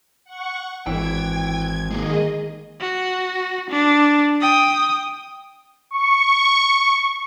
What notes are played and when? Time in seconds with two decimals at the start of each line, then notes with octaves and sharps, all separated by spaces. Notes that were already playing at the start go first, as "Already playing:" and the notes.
0.25 F#5 C#6
0.87 G#1 E3 G5 G#6
1.91 D#3 G#3 A#3 G#4 D#5
2.80 F#4
3.70 D4
4.41 G5 D#6
5.91 C#6